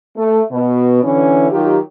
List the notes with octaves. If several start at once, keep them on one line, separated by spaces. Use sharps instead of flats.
A3
B2
D3 E3 C#4
D#3 F#3 D#4 F4 G4